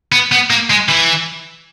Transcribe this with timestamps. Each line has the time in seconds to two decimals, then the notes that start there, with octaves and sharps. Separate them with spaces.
0.12 B3
0.32 B3
0.50 A#3
0.70 G#3
0.89 E3